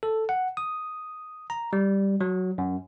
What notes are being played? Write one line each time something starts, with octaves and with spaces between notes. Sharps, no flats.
A4
F#5
D#6
A#5
G3
F#3
F#2